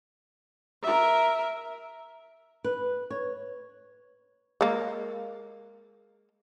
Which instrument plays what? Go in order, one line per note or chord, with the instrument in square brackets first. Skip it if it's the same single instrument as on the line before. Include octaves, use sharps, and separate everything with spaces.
[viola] A#4 E5
[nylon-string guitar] B4
C#5
[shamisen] G#3 A#3